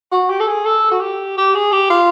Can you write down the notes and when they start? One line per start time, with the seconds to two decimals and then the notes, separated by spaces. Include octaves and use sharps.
0.12 F#4
0.30 G4
0.40 A4
0.47 G#4
0.65 A4
0.91 F#4
1.01 G4
1.38 G4
1.55 G#4
1.72 G4
1.90 F4